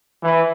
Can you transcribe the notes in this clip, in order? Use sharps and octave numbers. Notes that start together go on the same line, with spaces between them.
E3